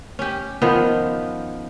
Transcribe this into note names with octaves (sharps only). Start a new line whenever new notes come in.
C#4 G4
D#3 F3 B3